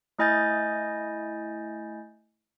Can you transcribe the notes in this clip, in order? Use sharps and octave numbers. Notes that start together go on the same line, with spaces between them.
A3 E4 D#5 G#5 G6 A6